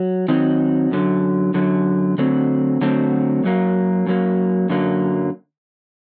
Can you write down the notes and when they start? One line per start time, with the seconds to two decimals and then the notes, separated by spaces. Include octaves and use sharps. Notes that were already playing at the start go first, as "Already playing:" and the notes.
Already playing: F#3
0.28 D#3 F#3 C4 D#4
0.91 F#2 D3 F#3
1.54 F#2 D3 F#3
2.18 D3 F#3 A3 C4
2.81 D3 F#3 A3 C4
3.44 F#2 F#3 A#3
4.07 F#2 F#3 A#3
4.69 F#2 D3 F#3 A#3